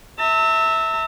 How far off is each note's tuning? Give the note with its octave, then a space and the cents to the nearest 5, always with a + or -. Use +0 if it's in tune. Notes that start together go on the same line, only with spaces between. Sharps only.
E5 -15 A5 +45